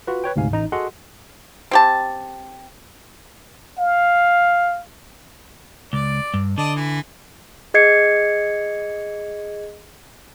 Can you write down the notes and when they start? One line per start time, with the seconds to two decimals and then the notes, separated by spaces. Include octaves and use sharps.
0.07 F4 F#4 B4
0.24 B4 C#5 G5
0.36 D2 G#2 C3 F5 G#5
0.52 A1 D#4 A#5
0.72 F#4 G#4 A4 D#5 F#5 C6
1.71 C4 G4 A5
3.78 F5
5.93 C#2 D5
6.34 G2
6.58 D3 D5 D#5 A5
6.76 E3
7.74 G#4 D#5 G#6 C7 C#7